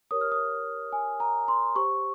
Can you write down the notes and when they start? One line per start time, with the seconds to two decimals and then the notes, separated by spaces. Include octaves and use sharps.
0.11 G4 A#4 C#5 D#6
0.21 F6
0.32 D#6
0.92 G#5
1.20 A#5
1.48 C6
1.75 G4 C5 C#6